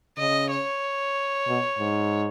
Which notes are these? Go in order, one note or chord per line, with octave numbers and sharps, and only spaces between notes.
C#3 D#5
C#5
B2
G#2